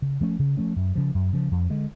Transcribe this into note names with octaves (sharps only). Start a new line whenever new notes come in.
C#3
F3 A3 C#4
C#3
F3 A3 C#4
F#2
C#3 F3
F#2
C#3 F3
F2
D3 G#3